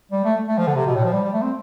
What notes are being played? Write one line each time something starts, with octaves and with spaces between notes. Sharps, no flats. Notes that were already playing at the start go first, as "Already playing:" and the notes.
G3
A3
A3
F3
D3
C3
B2
A2
F3
G3
G3
A3
C4